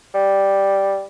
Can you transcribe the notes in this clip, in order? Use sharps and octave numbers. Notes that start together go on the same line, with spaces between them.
G3